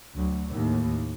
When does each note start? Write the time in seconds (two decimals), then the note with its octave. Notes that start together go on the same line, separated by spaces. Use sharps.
0.14 D2 F#3
0.47 D#2 A2